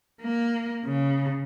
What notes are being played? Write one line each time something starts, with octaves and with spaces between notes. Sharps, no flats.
A#3
C#3